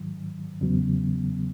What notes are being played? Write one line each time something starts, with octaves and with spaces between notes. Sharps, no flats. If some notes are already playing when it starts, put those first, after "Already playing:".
Already playing: G#2 D#3 F#3
E2 C#3 F#3 B3